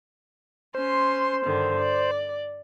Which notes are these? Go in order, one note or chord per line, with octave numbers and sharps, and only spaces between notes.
C#4 C5 C6
G2 D3 D#3
D5